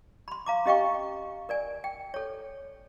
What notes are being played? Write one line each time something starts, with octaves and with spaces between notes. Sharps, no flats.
B5 C6
F5 A#5 D6
C#4 G4 D#5 F5 G5 C#6
A#4 D5 G#5
G5
A4 C#5